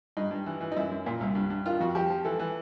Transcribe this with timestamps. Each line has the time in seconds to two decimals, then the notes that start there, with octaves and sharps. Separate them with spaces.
0.17 G2 D#4
0.31 G2
0.46 E3
0.61 E3
0.72 D#4
0.76 F#2 E4
0.91 F#2
1.06 A#2
1.21 C2
1.35 G2
1.50 G2
1.66 D#3 F4
1.80 F2 F#4
1.95 F3 G4
2.10 F3
2.25 E3 A4
2.39 E3